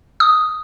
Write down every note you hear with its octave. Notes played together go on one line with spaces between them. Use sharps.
D#6